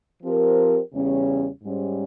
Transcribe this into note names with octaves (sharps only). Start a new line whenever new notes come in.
F3 C4 G4 A#4
E2 C#3 G3 C#4
G#2 G3 C#4